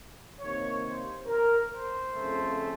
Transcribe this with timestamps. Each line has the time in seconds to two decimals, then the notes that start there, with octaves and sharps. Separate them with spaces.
0.40 C3 D#3 A#3 C#5
0.85 C5
1.27 A#4
1.71 C5
2.15 F2 C#3 A3